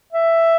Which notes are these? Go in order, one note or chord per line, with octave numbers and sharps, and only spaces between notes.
E5